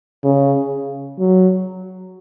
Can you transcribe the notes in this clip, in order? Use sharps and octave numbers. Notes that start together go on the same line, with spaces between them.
C#3
F#3